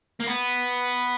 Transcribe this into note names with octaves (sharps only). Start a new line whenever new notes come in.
A#3
B3